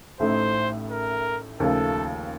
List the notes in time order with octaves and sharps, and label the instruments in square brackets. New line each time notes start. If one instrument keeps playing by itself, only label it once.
[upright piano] A1 A2 A3 D#4 [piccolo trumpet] C5
[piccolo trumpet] A#4
[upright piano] D#2 C#3 F3 A3 [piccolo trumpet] A4